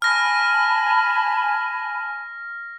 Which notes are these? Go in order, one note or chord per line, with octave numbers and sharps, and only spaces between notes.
G#5 A5 B5 F6 A#6